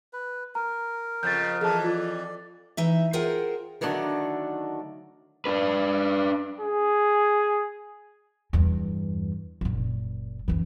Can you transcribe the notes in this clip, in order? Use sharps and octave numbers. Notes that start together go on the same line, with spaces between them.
B4
A#4 A#5
F2 C#3 G6 A6
F2 E3 G#4 A4 A5
F4 A4 D5
E3 D#4 E5
F4 G#4 A#4 C5 F#5 G5
D3 D#3 F#3 A3 D4
D4 B4
G#4
E2 G2
F#1 A#2
F#1 E3